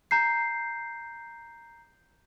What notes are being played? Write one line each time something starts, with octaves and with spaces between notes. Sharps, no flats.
A#5 G6 C7